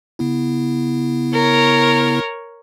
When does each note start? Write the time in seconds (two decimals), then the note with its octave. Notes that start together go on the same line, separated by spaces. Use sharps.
0.19 C#3 B3 E4
1.34 A#4 C#5